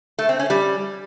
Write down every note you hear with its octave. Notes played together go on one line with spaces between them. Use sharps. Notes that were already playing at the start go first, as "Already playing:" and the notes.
A3
C4
C#4
G3